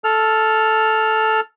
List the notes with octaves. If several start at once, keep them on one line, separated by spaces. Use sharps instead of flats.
A4 F6